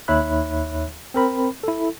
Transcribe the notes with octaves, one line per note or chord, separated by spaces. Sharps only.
D#2 D#4 C#5 E5 B5 F#6
C4 A#4 B5
E4 A4